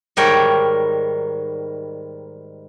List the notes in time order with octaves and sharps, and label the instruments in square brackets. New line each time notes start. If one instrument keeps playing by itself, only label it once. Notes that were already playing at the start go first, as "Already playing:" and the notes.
[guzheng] G#2 D#3 G3 A#4 C#5 G5